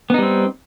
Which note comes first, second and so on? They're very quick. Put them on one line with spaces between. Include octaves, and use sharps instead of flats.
B3 D#4 G3 C4